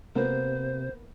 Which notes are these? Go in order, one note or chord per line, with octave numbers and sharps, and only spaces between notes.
C3 A#3 B3 C5